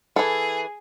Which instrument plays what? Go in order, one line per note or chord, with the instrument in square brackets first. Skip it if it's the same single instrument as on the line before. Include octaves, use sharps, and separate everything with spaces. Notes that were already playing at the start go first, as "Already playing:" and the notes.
[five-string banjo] E3 A4 [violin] G#4